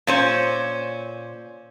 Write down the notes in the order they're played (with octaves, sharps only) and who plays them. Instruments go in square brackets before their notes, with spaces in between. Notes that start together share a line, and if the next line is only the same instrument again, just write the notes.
[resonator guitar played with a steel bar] A#2 C#4 C5